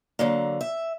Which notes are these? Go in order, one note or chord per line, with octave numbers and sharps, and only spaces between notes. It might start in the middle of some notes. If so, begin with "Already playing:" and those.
D3 F#3 A#3
E5